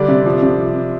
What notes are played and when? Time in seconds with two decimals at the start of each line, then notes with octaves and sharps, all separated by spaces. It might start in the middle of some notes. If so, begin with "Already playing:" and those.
Already playing: D3 G3 D4 D5
0.08 C3
0.26 F3
0.43 C3